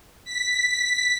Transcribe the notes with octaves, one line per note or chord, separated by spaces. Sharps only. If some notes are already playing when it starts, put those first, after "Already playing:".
B6